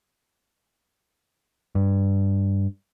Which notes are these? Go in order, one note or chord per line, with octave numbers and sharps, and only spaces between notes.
G2